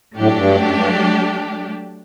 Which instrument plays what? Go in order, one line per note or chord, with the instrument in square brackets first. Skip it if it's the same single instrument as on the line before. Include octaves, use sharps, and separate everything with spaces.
[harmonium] A2 [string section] F#3 A3 D4 G4
[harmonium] A2
G2
F#2
F#2
G2